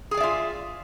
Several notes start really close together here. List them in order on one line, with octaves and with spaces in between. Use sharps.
G#4 G#5 D5 E5 F4